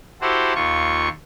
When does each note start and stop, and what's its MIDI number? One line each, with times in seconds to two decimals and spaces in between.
0.21 0.54 64
0.21 0.54 66
0.21 0.54 67
0.21 0.54 69
0.21 0.54 72
0.55 1.09 39
0.55 1.09 65
0.55 1.09 85